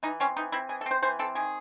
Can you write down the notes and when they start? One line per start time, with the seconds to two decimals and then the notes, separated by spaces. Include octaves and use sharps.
0.03 E3 D#4
0.20 C4 C#4
0.37 E3 D#4
0.52 C4 E4
0.69 E3 G#4
0.81 A4
0.86 C4
0.91 C5
1.03 E3 C5
1.19 C4 A4
1.35 D#3 G#4